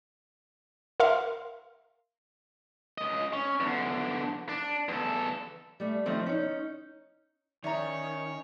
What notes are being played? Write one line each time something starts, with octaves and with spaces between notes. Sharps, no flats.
A#4 E5 F5 C6
C#2 D#5
C#4
E2 D3
D4
E2 A4
G3 A3
D#3 F3 A3 C4
C#4 D#4
D#3 C#4 C#5 D5 E5 A#5